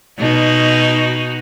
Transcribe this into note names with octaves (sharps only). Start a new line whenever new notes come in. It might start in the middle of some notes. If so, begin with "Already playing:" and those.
B2 D#4 F#4